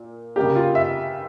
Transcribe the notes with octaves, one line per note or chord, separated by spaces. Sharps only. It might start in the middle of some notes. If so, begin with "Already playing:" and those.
Already playing: A#2
C#3 G3 A#3 G4
F4
E5